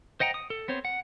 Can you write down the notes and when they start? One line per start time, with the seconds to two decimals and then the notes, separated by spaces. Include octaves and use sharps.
0.20 C5 D#5 F#5 G5 A#5
0.34 D#6
0.50 A4
0.68 B3 C4 C5 C#5
0.85 F#5